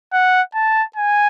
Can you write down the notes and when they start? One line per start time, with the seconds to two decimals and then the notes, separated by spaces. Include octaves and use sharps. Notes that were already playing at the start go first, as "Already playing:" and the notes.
0.13 F#5
0.55 A5
0.96 G#5